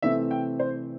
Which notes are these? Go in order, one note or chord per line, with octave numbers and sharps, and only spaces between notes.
C3 E3 A3 C4 E5
G5
C5